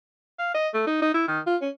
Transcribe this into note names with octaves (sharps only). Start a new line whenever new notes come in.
F5
D#5
A3
D#4
D#4
E4
D#3
F4
C#4